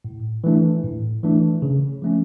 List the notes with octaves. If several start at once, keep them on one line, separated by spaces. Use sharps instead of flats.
A2
E3 A3 D4
A2
E3 A3 D4
C#3
F3 A3 C#4